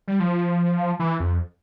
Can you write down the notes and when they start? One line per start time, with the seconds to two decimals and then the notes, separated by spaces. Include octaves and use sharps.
0.08 G3
0.20 F3
0.99 E3
1.20 F2